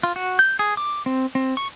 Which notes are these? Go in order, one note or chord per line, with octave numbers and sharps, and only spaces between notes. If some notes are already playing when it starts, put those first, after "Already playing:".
F4
F#4
G6
G#4
D6
C4
C4
C#6